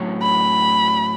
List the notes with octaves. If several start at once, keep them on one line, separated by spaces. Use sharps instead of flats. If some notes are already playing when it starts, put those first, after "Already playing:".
Already playing: A2 F#3 C#4
B5